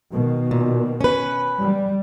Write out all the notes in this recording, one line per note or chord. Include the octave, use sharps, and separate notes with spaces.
B2 D#3
A#2
C#4 B4
G3